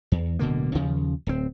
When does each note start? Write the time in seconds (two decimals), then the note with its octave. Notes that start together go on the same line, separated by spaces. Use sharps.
0.12 E2
0.39 D1 B2 D3 A#3
0.75 D#2 C#3 F3
1.27 D1 C4